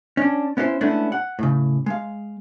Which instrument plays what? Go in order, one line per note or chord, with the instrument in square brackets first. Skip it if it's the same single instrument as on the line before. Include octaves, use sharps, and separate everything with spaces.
[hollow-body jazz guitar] C#4 D4
B3 C#4 E4 A#4 C5
G#3 A3 B3 C#4 D4 E4
F#5
A2 C#3
G#3 F5